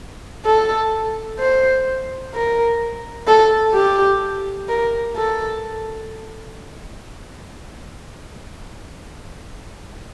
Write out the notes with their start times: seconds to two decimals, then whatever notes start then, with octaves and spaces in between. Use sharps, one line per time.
0.45 A4
1.39 C5
2.34 A#4
3.27 A4
3.74 G4
4.68 A#4
5.16 A4